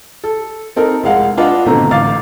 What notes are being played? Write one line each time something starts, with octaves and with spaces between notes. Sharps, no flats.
A4
C4 D#4 A4 A#4
F1 G#3 F5 F#5
D4 F4 B4 D#5 F5 F#5
G#1 B2 D3 A3 C4 A#5
A1 F5 D6 A6